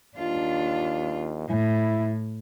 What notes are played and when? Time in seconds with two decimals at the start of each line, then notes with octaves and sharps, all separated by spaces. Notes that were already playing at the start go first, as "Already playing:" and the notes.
0.18 D#2 D4 F4
1.49 A2 E4